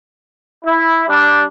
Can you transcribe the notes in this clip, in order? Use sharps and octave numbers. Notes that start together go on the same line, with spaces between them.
E4
G3 D4